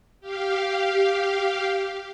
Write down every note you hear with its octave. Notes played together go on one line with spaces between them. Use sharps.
G4 F5